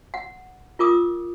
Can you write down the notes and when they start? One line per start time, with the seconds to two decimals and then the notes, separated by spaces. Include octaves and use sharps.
0.14 F#5
0.79 F4 A#4 D6 D#6